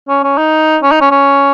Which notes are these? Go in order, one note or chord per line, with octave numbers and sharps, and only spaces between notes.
C#4
C#4
D#4
C#4
D#4
C#4
C#4